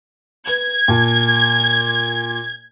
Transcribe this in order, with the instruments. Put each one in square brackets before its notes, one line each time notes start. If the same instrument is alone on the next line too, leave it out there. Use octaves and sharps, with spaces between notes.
[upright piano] B4 [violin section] G#6
[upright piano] A#2 A5